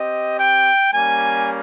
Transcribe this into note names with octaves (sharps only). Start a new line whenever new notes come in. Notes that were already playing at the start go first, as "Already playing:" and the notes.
Already playing: C4 G4 D#5
G5
G3 A#3 C#4 G#5